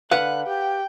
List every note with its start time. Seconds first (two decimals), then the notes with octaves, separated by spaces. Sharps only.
0.11 D3 B4 F5 F#5 F#6
0.47 G4 G5